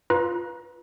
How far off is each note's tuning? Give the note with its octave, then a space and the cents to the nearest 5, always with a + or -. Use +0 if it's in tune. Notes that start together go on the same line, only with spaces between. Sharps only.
F4 +0 B4 -5 A#5 +30